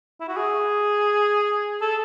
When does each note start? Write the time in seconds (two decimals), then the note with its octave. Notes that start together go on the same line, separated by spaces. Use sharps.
0.20 E4
0.28 F#4
0.37 G#4
1.81 A4